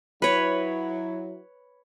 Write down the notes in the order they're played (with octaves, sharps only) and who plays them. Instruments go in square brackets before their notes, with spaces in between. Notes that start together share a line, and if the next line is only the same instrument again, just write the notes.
[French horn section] F#3 E4 [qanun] B4 C#5